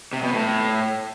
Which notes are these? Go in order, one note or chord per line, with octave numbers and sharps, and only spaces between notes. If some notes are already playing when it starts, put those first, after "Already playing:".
C3
B2
A2